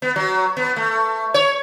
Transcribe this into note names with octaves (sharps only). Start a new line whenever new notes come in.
B3
F#3
B3
A3
C#5